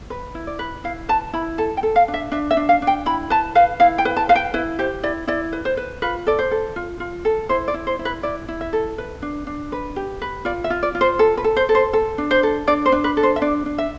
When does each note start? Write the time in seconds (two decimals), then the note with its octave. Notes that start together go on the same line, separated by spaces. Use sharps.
0.10 B4
0.35 E4
0.47 D5
0.59 B4
0.84 E4 F5
1.09 B4 A5
1.33 E4 B5
1.58 A4 A5
1.77 G5
1.83 A4
1.96 F5
2.08 D4
2.14 E5
2.32 D4 E5
2.51 E5
2.57 D4
2.69 F5
2.82 D4
2.87 G5
3.06 E4 B5
3.30 B4 A5
3.55 B4 F5
3.80 E4 F5
3.98 G5
4.05 B4
4.16 A5
4.29 B4 F5
4.35 G5
4.54 E4 B4
4.79 G4 C5
5.03 E4 D5
5.27 E4 D5
5.53 B4
5.65 C5
5.77 B4
6.02 F4 B4
6.26 A4 D5
6.39 C5
6.51 A4
6.76 F4
7.00 F4
7.25 A4
7.49 E4 C5
7.68 D5
7.74 E4
7.87 C5
7.99 E4
8.05 B4
8.23 E4 D5
8.48 E4
8.61 E5
8.73 A4
8.98 B4
9.22 D4
9.47 D4
9.72 B4
9.96 G4
10.22 B4
10.45 F4 D5
10.64 E5
10.70 F4
10.83 D5
10.95 F4
11.01 C5
11.19 A4
11.37 B4
11.44 A4
11.56 C5
11.69 A4
11.75 C5
11.93 A4
12.18 D4
12.31 C5
12.43 A4
12.67 D4 D5
12.86 C5
12.92 D4
13.04 B4
13.17 A4
13.23 C5
13.36 E5
13.42 D4 D5
13.66 D4
13.78 E5